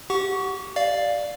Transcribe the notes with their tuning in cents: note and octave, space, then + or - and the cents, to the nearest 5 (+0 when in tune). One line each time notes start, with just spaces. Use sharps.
G4 -15 F#5 +0 C#6 +15
D5 +0 F5 +0